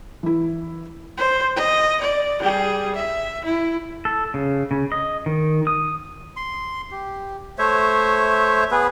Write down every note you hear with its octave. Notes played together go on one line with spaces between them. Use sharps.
E3 E4
C5
D#5
D5
G3 G#4
E5
E4
A4
C#3
C#3
D#5
D#3
D#6
C6
G4
A3 C5 C#5 E5
B3 G#4 B4